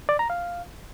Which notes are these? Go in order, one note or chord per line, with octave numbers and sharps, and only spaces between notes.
D5
A#5
F5